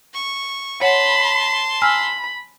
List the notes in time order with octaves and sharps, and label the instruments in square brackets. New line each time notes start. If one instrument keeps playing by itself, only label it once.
[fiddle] C#6
[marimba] C#5 F#5 [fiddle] A5 C6 [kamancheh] B5
[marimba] G#5 E6 F6 [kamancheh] B5